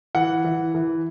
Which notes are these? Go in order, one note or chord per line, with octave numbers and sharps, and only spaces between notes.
E3 F#5
E3
E3